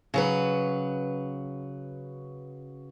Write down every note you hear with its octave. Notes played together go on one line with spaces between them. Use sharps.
C#3 F#3 B4